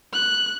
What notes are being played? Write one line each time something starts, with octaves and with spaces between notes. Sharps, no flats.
F#6